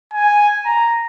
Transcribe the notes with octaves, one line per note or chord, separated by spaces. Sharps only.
G#5
A#5